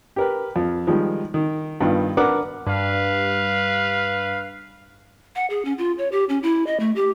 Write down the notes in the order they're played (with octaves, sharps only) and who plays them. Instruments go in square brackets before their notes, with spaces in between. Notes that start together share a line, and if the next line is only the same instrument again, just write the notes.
[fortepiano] G4 A#4 B4
F2
D#3 F3 G3 G#3
D#3
G2 D#3 B3 F4
D4 A#4 B4 F#5 D6
[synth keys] G2 [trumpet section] B4 F5
[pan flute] F#5
G#4
C#4
F4
C#5
G4
C#4
E4
D#5
A3
G4